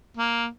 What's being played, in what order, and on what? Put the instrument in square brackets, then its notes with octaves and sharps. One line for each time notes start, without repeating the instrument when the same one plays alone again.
[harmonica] A#3